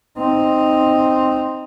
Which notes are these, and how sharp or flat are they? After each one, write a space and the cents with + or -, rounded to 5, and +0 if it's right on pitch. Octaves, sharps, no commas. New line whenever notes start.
C4 +0 D#4 +0